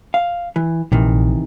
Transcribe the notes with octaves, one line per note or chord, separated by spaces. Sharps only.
F5
E3
A#1 C3 D#3 E3